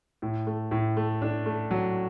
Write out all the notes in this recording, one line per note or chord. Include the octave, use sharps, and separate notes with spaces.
A2
A3
A2
A3
D4
A3
F#3